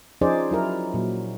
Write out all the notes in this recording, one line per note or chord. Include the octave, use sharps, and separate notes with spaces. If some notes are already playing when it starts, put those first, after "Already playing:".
F3 C#4 D#4 G#4 C5 D5
F#3 E4 A#4
A#2 F#3